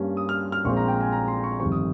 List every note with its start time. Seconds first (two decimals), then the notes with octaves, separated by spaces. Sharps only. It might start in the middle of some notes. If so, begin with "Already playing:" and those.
Already playing: G2 G3 A#3 C#4
0.17 D#6
0.29 F6
0.52 F6
0.64 A#1 A#2 G#3 C4 C#6
0.77 A#5
0.88 G5
1.01 G#5
1.12 A#5
1.28 C6
1.44 C#6
1.59 G1 F2 D#3 G3 C4 C#6
1.72 D#6